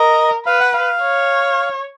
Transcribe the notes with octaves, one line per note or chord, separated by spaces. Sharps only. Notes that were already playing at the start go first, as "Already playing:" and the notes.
Already playing: A#4 D#5
B4 F5
F#5
F5
C#5